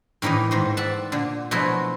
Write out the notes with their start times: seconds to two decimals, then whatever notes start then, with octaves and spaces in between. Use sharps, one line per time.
0.22 A2 D#3 E3 A#3 D#4
0.51 G#2 D#3 C5
0.77 D5 E5 F#5 A5
1.12 A#2 D3
1.51 B2 F3 F#3 A3 E4 F#4